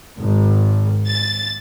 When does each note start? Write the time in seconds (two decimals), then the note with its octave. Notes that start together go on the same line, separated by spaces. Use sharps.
0.18 G#1
1.06 A6